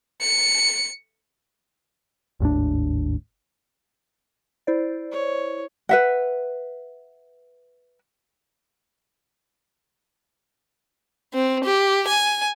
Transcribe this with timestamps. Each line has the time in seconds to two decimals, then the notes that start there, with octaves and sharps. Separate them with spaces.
0.21 C#7
2.40 G#1 D#2 A2 D4
4.67 E4 C5 D5
5.12 C#5
5.89 B4 E5 F#5
11.34 C4
11.65 G4
12.08 G#5